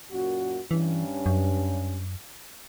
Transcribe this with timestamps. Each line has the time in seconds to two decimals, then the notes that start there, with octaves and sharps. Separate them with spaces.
0.11 F#2 A#2 F#4
0.71 G2 E3 C#4
1.26 F#2